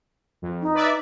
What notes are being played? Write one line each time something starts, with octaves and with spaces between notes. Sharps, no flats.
F2
D#4
B4 D5 E5